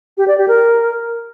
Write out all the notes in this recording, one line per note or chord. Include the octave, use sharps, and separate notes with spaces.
G4
D5
G4
A#4